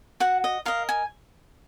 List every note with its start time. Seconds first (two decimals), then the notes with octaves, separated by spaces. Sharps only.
0.20 F#4 F#5
0.44 D#5
0.66 A#4 D#5 F5
0.89 G#5